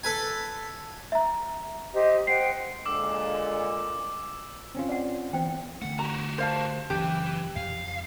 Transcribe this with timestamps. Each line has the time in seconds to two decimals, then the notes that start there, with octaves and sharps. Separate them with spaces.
0.04 A4 B4 G#5
1.12 E5 A#5
1.93 G4 C5 D#5
2.27 C5 F#5 G5 C7
2.86 A#2 D3 G#3 D6 E6
4.75 C4 C#4 F4
4.89 D5 F#5
5.33 E3 B3 C4 C5 G5
5.82 D3 A3 F#5
5.99 F#4 G4 A#5
6.38 C5 F5 A5
6.90 F#1 E3 C#4 G4
7.56 F2 F5